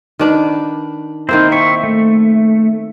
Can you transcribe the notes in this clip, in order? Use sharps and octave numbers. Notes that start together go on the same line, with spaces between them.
D#3 D4 B4
D#3 A#3 C4 E4 C5
C4 E5 C#6
A3